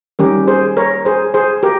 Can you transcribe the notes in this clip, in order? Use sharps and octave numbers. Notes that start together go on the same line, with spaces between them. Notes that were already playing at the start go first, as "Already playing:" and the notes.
D#3 G3 C#4 G4 A#4
G#4 C5
A#4 C#5
G#4 C5
G#4 C5
G4 A#4